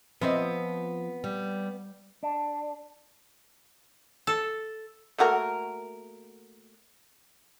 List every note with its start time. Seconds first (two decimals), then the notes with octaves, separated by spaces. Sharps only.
0.21 F3 B3 C4 D#5 E5
1.24 G3
2.23 D4
4.27 A4
5.18 A3 A#3 F#4 A#4